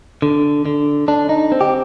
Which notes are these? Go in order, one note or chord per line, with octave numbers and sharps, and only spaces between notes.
D3
D3
D3 D4
D#4
C4
G4